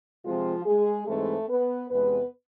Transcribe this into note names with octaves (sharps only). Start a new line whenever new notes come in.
C3 F3 G#3 C4 F4
G#3 G#4
G#2 E3 G#3 A3 C4 A4
B3 B4
E2 C3 G#3 B3 B4